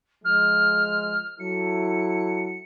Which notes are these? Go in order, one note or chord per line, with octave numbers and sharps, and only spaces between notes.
F3 G#3 F6
F#3 E4 A4 C#7